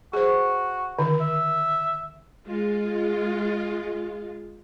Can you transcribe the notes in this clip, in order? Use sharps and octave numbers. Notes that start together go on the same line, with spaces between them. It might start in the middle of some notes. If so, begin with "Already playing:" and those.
F#4 G#4 C5
D3 D#3
E5
G#3 F4